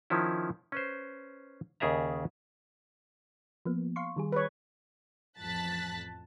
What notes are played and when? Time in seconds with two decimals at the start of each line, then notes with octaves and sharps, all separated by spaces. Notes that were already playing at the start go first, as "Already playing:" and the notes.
0.10 D#3 F3 C#4 E4
0.72 C#4 B4 C5
1.80 D#2 C#3 G#4 D5 E5 A#5
3.65 F3 A#3 B3
3.96 F5 C6 C#6
4.16 D#3 G3 G#4
4.32 B4 C#5
5.39 A1 F2 A5 F#6 A6 B6